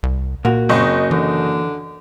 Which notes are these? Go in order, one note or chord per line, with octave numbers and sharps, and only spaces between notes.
C2
A#2 A#3 F#4
F#1 C4 D#5 C#6
D3 E3